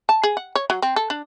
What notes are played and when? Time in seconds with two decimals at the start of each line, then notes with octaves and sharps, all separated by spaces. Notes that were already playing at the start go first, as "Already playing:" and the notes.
0.09 A5
0.23 G#4
0.37 F#5
0.55 C#5
0.70 F#3
0.82 C4
0.96 A4
1.10 D4